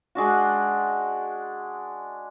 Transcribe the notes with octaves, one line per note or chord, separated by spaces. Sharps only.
G#3 D4 F#4